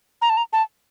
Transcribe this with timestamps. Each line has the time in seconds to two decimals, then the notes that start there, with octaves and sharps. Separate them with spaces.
0.22 A#5
0.30 A5
0.37 A#5
0.53 A5